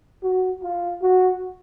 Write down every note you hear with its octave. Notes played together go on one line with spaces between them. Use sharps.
F#4
F4
F#4